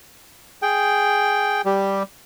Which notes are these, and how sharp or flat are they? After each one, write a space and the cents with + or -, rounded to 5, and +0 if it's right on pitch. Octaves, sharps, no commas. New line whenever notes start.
G#4 +0 G5 +0
G3 +0 G4 +0